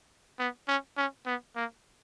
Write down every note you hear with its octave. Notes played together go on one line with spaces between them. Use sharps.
B3
C#4
C#4
B3
A#3